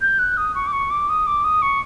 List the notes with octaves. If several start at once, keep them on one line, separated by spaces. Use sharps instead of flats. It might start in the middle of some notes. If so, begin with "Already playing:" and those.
G6
F#6
D#6
C#6
D6
C#6
D6
D#6
D6
D#6
C#6